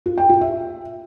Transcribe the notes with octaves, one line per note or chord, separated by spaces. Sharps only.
F4
G5
F4
E5